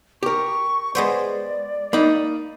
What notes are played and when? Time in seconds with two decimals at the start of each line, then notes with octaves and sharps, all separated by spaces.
0.23 G4 A#4 C#6
0.95 G#3 B3 C5 D5
1.93 A#3 D#4 B5